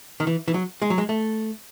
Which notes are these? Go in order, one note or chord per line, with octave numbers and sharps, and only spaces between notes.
D#3
E3
E3
F#3
G#3
F#3
G#3
A3